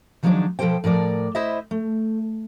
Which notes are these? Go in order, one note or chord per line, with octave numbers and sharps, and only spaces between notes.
D#3 F3 F#3 G#3 D4 D#4
B2 F3 B3 A4 C5 G5
A2 F3 A#4 D5
E4 C5 D#5 E5
A3